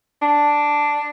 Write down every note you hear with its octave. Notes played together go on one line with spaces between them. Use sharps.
D4